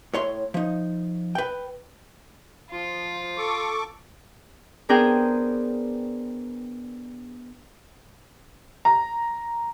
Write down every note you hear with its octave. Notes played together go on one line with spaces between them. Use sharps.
A2 C#5 C6
F3 D#4
B4 G5
F3 F4
A4 C#6 D6
B3 D4 G#4 A#4 C5 G5
A#5